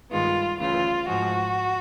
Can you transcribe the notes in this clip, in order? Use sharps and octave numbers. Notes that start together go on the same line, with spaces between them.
G2 D#3 G#3 B3 F4
D2 C#3 E3 F4
G#2 F3 G#3 F#4